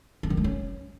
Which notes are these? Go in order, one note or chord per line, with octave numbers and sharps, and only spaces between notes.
C4
D#3
G#3
C#4